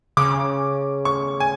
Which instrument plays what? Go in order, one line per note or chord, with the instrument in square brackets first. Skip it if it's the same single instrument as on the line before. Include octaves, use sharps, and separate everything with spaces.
[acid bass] C#3 [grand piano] D6
[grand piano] C#6
G#5